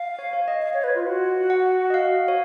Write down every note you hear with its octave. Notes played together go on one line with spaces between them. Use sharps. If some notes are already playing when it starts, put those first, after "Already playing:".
Already playing: F5
C#5
C#5
D#5
F5
C#5
B4
F4
F#4
F#5
D#5
F5
C#5